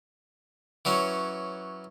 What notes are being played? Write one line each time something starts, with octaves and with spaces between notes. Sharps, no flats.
E3 F#3 C#4